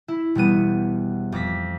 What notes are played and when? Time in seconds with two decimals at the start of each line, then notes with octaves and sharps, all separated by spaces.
0.08 E4
0.35 E1 G3 B3 D#7
1.32 F2 D6 A#6 B6